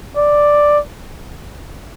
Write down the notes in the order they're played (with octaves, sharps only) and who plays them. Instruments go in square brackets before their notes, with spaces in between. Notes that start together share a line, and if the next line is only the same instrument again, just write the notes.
[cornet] D5